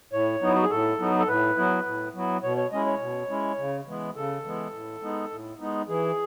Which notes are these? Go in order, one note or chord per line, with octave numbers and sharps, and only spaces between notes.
A2 C#5
F#3 B3 D#4
E4
F#4
G#4
A2 A4
F#3 B3 D#4
A4
A2 B4
F#3 B3 E4
A2
F#3 B3 E4
B2 C#5
C#5
G#3 C#4 E4 D#5
C#5
B2
G#3 C#4 E4
C#3
E3 G#3 B3
C#3 A4
E3 G#3 B3
A2
G#3 B3 D#4
A2
G#3 B3 D#4
E3 G#4